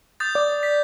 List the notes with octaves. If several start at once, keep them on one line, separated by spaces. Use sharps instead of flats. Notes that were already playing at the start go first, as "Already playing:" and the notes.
D#6 G6 A6
D5
B6